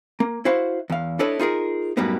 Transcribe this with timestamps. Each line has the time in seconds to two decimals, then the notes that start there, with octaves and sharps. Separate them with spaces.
0.20 A#3
0.45 E4 F#4 C5 F5
0.90 E2 F5
1.19 D4 E4 A4 B4 C#5 D#5
1.39 D#4 F4 G#4 A#4
1.97 F#2 A2 G3 A#3 B3 D#4